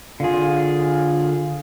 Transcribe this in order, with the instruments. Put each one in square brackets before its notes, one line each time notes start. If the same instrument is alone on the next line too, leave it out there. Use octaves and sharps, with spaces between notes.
[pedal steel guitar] D3 G#4 [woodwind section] F4